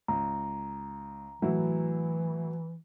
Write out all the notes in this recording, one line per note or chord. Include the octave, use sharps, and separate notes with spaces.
C#2 A#5
A2 E3 F#3 E4